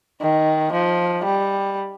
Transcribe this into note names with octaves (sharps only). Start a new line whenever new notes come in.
D#3
F3
G3